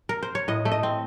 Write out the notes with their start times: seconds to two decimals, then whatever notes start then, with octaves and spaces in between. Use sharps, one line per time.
0.09 A#4
0.23 C5
0.35 C#5
0.48 A2 D#5
0.65 A3
0.72 D#5
0.83 C4